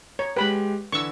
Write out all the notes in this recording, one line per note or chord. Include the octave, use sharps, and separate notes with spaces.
C#5 A#5
G#3 G4 B4 B5
D3 E3 D4 C#6 E6